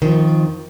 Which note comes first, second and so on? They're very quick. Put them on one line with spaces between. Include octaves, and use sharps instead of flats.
D#3 F3 F2